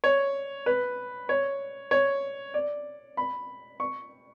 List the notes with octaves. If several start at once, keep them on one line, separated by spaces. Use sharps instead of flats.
C#5
B4
C#5
C#5
D5
B5
C#6